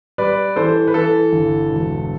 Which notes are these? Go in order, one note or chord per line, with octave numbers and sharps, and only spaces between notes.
G3 B4 D5
E3 A4 C5
B4
E3 A4
G1
E1